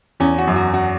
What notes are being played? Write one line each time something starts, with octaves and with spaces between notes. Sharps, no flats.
E2 C#4
F#4
F#2
F#4
F#4